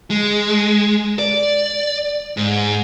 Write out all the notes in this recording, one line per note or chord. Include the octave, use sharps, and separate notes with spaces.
G#3
D5
G#2